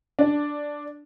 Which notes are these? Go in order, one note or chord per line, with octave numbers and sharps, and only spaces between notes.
D4